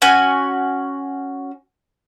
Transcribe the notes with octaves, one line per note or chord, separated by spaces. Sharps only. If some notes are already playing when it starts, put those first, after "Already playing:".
C#4 F#4 G#5